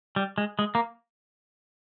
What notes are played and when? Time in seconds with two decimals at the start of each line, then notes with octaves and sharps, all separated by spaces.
0.16 G3
0.38 G#3
0.59 G#3
0.75 A#3